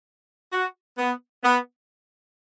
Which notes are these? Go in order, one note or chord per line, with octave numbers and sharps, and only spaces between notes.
F#4
B3
B3